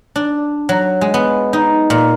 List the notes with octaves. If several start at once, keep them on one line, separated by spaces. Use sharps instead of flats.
D4
F#3
G#3
B3
D#4
A#2